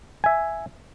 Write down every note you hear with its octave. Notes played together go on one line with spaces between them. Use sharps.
E5 G#5